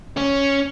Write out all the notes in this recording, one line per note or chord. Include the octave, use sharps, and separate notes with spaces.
C#4